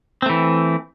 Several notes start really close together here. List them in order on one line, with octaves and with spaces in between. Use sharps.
C4 A3 E3